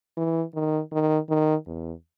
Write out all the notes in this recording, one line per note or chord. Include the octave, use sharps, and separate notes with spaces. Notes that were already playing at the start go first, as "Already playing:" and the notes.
E3
D#3
D#3
D#3
E2